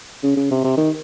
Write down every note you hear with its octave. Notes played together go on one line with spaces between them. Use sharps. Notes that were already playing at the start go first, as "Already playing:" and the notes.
C#3
C#3
C3
C3
D#3